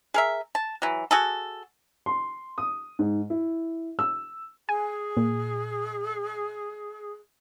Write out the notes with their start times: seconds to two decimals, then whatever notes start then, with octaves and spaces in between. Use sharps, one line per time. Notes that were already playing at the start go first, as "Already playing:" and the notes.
0.14 G#4 A#4 E5
0.55 A5
0.82 E3 F#3
1.11 F#4 G#4 A4
2.06 C6
2.58 D#6
2.99 G#2
3.30 E4
3.99 E6
4.69 G#4 G#5
5.17 A#2